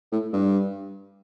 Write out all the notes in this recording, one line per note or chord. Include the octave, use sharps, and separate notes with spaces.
A2
G2